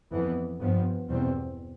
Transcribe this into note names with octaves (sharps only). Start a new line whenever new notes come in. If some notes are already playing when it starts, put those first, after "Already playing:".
F2 E3 B3
G2 F3 B3
E2 B2 G3 C4